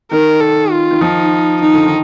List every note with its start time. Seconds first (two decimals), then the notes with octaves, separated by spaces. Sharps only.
0.11 D#3 A#4
0.41 A4
0.71 F4
0.91 D#3
1.01 F3 D#4
1.61 D#3 D#4
1.74 D3
1.86 D#3